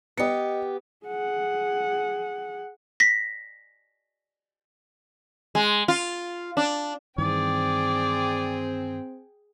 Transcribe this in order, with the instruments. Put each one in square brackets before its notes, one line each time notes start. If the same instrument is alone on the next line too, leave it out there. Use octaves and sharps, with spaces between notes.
[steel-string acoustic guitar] B3 G4 [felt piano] D#5 C#7
[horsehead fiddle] G#4 F#5
[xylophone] A#6 B6
[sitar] G#3
F4
D4
[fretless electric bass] G2 D#3 E3 [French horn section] C4 [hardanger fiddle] G#4 G5 [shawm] D5